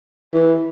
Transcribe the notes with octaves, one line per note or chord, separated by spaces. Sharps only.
E3